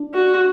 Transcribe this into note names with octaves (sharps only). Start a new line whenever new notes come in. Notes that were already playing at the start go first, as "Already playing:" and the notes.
Already playing: D4
F#4